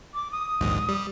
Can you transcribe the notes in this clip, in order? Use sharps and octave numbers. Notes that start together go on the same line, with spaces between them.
D6
D#6
A#1 D#2 G#2
G3